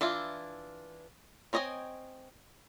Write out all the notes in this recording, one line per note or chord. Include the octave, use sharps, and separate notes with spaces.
E3 D4 E4 F4
C4 C#5 D#5 G5 G#5